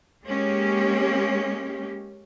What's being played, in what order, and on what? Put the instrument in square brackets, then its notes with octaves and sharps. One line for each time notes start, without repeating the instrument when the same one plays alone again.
[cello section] G#3 A#3 C#4 G4